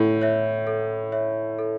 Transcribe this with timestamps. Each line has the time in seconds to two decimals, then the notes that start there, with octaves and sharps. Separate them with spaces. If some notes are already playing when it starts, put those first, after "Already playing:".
Already playing: A2 A4 C#5 E5
0.21 C#5 E5
0.67 A4
1.12 C#5 E5
1.59 A4